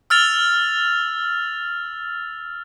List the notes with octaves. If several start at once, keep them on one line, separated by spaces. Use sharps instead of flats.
E6 F6 A6 F7